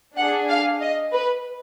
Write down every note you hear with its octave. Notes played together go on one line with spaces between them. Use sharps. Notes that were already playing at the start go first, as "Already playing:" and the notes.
D4 G#4 F#5
F5
D#5
B4